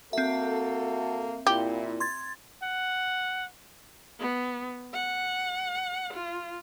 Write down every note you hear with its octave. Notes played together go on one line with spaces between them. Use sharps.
A#3 C4 F#4 A4 E5
A#2 E4 G4
C6 G#6 A6
F#5
B3
F#5
F4